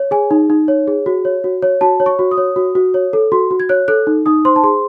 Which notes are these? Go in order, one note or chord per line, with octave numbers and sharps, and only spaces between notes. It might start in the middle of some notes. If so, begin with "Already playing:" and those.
Already playing: C#5
G#4 G#5
D#4
D#4
C#5
G#4
F#4
C#5
F#4
C#5
F#4 A5
C#5
C#6
F#4
D#6
C#5
F#4
F#4
C#5
A4
F#4 C6
F#4
G#6
C#5 F#6
A4 F#6
D#4
D#4 D#6
C5 C6
A5
G#4 C6